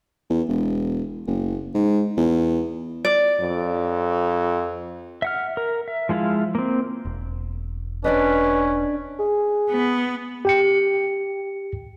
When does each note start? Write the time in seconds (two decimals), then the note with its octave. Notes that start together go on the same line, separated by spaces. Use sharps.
0.30 E2
0.48 E1
1.27 F#1
1.74 G#2
2.17 E2
3.05 D5
3.41 F2
5.22 E5 F#5 F6
5.57 A#4
5.88 E5
6.09 F3 G#3 E4 F4 F5
6.55 A#3 C4
7.05 E1
8.04 C#4 D4 B4 D5 D#5
9.19 G#4
9.71 B3
10.45 G4 G5 C#7